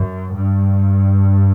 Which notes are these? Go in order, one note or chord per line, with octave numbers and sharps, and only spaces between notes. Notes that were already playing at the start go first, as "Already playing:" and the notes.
Already playing: F#2
G2